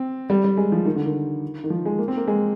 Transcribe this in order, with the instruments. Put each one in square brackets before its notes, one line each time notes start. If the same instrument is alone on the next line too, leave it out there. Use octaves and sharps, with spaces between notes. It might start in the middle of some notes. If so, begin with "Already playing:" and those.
Already playing: [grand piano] C4
G3
G3
G#3
F3
D#3
D3
D#3
D#3
F3
G#3
A#3
C4
A#3
G#3